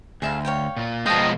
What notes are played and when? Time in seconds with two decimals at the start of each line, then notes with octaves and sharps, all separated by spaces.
0.22 D2 G#4 E5 F5
0.45 C#5 F5 G5
0.77 A#2 F4
1.06 B2 F3 G#3 D#5 F5 G5 A5